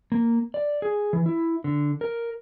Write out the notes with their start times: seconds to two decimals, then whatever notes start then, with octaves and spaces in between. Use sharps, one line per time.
0.12 A#3
0.54 D5
0.82 G#4
1.13 E3
1.26 E4
1.64 D3
2.01 A#4